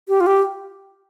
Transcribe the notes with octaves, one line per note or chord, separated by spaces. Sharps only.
G4
F4
G4